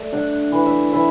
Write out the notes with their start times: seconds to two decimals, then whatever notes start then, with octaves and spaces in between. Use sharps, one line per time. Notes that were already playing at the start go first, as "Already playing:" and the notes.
Already playing: A3 D5 E5
0.13 D4 F#5
0.52 E3
0.66 E5
0.93 E3 E5